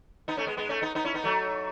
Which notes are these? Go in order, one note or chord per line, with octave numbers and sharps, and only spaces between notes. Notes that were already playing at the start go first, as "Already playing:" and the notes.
B3 D#4
A3 C#4
G#3 B3
G#3 B3
A3 C#4
B3 D#4
B3 D#4
C#4 E4
B3 D#4
F#3 A3